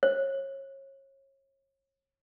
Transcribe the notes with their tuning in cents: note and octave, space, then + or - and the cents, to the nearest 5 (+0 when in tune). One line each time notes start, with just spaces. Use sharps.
C#5 -30